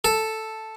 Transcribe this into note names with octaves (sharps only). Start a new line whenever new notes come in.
A4